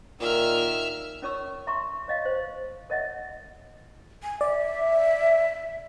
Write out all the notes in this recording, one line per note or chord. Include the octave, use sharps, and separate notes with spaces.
A#2 D#3 E5 F6
C#4 F4 A#4 C#5 C#6 E6
E5 A#5 C6 C#6
C#5 D#5 F5
C5
A#4 C#5 D#5 E5 F#5
G#5
D5 E5